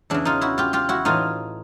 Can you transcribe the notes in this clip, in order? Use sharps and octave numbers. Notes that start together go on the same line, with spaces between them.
E2 C#3 E3 D4 E4
D#4 F4
E4 F#4
F4 G4
F4 G4
E4 F#4
A2 E3 D#4 F4